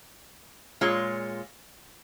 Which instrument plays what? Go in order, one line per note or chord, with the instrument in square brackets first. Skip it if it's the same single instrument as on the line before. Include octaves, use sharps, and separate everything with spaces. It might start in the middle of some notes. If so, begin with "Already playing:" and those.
[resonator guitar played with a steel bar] A#2 G#3 F4 C#5